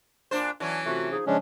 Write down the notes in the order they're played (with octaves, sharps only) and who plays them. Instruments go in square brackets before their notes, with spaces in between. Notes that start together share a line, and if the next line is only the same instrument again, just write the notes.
[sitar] A#2 D4 C5
[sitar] E3 F#3 C#4 [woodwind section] D4
[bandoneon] C3 [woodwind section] A3 F4 F#4
[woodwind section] F3 D#4 G#4
[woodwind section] C#3 F3 [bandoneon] G#3 C#4 D4